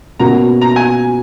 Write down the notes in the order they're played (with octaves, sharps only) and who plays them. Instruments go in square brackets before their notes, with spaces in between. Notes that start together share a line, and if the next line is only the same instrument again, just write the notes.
[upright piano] B2 A#3 C#4 F#4 [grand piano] A#5
[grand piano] A#5
G#5